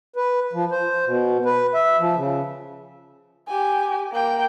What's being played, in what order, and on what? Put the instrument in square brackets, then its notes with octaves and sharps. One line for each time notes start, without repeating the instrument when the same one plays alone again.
[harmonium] B4
F3
C5
B2
B4
E5
F3
C#3
[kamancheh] G4 G#5
A#3 G5